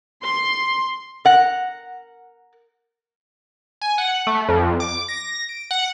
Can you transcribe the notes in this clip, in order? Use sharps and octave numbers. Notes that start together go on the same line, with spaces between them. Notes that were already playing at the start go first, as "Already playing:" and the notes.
C6
A#4 F#5
G#5
F#5
A3
F2
D6
A#6
D7
F#5